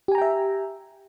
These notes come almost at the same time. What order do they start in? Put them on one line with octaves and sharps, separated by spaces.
G4 G#5 A#5 G5 E5